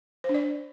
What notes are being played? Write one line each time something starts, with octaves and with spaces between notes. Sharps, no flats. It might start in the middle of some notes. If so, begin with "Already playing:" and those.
C5
D4
D5